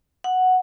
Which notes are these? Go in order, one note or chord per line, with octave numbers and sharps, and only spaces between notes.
F#5